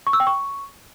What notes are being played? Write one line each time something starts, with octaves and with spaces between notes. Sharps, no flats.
C#6
E6
G5
C#6